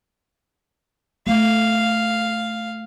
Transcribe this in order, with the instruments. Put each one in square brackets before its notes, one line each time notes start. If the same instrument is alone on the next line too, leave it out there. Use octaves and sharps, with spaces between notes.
[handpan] A3 [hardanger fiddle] F5